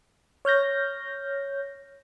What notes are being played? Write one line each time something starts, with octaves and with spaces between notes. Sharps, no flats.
C#5 F6 G6 A#6